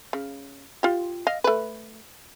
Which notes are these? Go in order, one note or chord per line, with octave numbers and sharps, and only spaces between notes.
C#3
F4 G4
D#5 F5
A3 B4